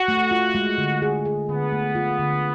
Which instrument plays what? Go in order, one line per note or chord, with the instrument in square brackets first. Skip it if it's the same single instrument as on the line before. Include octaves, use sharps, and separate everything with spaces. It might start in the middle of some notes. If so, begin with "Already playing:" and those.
Already playing: [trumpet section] F#4
[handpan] A3
F4
G#3
D3
G#4
G#4
[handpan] D3 [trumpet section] B3
[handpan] A3
F4
D3